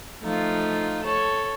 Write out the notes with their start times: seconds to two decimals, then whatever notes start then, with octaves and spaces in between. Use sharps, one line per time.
0.23 F3 A3 D#4 F4
1.03 A4 C#5